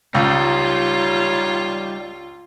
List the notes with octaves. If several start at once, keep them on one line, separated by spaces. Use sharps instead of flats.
C#2 G3 D#4 F4 C#5